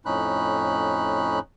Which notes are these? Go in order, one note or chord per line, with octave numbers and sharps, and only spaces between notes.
F2 A2 C#4 D#4 B5 F#6